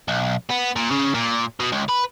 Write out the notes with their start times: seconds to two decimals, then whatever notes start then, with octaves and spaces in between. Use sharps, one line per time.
0.08 B1
0.50 B3
0.76 A#2
0.91 C#3
1.14 A#2
1.60 B2
1.72 C#2
1.89 B4